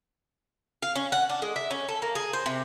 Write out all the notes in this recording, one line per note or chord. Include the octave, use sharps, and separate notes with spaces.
F5
C#4
F#5
D4
G#3
E5
C#4
A4
A#3
G#4
C5
C3